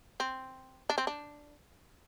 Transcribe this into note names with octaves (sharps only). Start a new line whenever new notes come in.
C4
D4
C4
D4